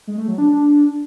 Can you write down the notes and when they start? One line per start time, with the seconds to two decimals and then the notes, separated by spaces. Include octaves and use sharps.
0.07 G#3
0.18 A3
0.28 F#3
0.38 D4